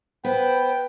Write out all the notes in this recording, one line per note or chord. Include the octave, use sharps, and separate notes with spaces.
B3 B4 C5 G5